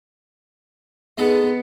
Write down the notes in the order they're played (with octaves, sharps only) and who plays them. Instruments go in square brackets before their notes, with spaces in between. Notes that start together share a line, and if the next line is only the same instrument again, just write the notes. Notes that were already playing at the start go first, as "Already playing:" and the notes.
[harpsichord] G#3 D#4 A4 [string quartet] B3